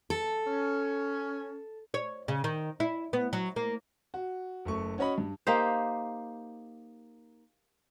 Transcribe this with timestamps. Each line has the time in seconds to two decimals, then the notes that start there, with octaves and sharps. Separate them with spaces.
0.10 A4
0.47 C#4
1.94 C#5
2.28 C#3
2.44 D#3
2.80 E4
3.13 B3
3.33 F#3
3.56 A#3
4.14 F#4
4.65 F#1 A3 C#6
4.98 C#4 F#4 C#5 D#5 B5
5.18 G2
5.47 A#3 D#4 G4 C5